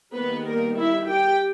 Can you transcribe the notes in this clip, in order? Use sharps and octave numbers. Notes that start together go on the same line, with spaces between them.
D#3 G3 A#3 B3 B4
A#3 A#4
E4 E5
G4 G5